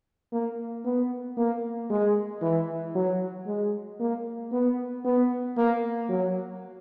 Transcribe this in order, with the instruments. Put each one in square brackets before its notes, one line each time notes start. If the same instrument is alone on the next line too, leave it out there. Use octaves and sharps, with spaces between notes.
[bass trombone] A#3
B3
A#3
G#3
E3
F#3
G#3
A#3
B3
B3
A#3
F#3